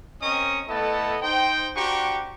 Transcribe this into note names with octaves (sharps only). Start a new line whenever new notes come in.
C4 C#4 A#4 D#5 C#6 D#6
A3 B3 E4 A4 D#5 A5
D#4 C5 G5
D4 F#4 G4 C5 A#5 C#6